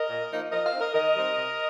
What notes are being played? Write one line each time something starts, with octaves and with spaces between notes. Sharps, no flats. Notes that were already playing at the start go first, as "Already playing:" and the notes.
Already playing: A#4 D#5
A#2
F3 A#3 D#4
F3 A#4 D#5
C5 F5
C4 D#4
A#4 D#5
D#3 A#4 D#5
G3 C4 D#4
C3